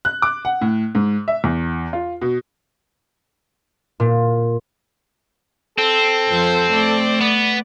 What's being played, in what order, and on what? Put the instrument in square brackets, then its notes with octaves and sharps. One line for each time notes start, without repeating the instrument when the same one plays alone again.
[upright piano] F#6
D6
F#5
A2
G#2
E5
E2
F4
B2
[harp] A#2
[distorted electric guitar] C4 [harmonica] A4
[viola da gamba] F2 F3 C5
A3 D5
[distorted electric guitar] B3